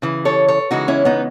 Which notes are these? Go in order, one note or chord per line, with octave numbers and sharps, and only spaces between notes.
C#3 E3
A4 C#5
A4 C#5
C#3 E3 G#3 D#4 F#4
C#4 E4
B3 D#4